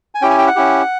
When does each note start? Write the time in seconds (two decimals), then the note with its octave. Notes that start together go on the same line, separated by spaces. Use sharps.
0.15 G#5
0.22 C#4 E4 G4 G5
0.30 G#5
0.38 G5
0.47 F#5
0.56 C#4 E4 G4